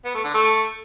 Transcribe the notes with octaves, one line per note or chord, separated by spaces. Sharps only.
B3
A3
D3
A3